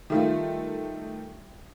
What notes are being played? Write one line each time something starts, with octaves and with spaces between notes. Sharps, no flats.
D#3 G3 A3 F4 E5